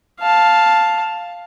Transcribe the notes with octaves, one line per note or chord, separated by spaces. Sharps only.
F5 A5